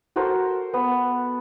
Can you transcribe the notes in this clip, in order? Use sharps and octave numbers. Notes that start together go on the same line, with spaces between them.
F#4 A4 A#4 C5
B3